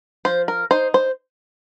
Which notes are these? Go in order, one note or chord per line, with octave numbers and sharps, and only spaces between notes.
F3 C5
A#4
D#4 C5
C5